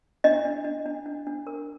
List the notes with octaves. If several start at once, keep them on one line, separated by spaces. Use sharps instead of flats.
D4 D#5
D4
D4
D4
D4
D4
A#4